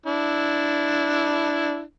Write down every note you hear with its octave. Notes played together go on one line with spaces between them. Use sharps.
D4 E4